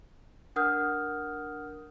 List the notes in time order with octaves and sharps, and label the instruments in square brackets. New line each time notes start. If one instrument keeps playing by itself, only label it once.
[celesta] D4 A#4 F#5 D#6 F6 G6